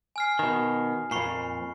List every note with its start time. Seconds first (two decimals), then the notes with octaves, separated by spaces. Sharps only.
0.16 G#5 F6 C7
0.39 B2 D#3
1.11 F2 A#2 B5 C#6 C7